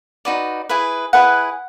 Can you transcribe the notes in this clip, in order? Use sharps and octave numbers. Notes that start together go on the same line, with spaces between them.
D#4 F#4 B4 D5
E4 G#4 B4
E4 G#4 B4 F#5